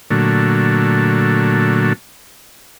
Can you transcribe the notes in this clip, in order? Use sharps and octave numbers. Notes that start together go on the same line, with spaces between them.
A#2 D3 F#3 A3